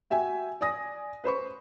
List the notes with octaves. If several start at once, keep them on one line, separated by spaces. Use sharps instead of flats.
F#4 E5 G5 G#5
D5 G#5 D#6 A#6
B4 C5 B5 C#6